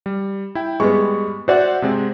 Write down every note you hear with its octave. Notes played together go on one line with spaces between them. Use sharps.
G3
E4 G5
G3 G#3 B3 B5 C#6
F#4 C5 D5 E5 F#5
C3 G#3 C4